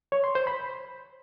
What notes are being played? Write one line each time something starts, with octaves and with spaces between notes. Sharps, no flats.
C#5
C6
C5
B5